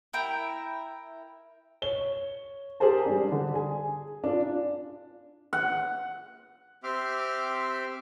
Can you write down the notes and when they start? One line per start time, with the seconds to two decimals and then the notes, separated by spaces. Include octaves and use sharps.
0.13 E4 A#4 G5
1.82 C#5 G7
2.80 G4 G#4 A#4 C5 A5
3.06 G3 D4
3.32 D3
3.53 G#4 G#5
4.24 D4 F4
5.53 F#5
6.83 C4 G4 E5 C6 D6 F6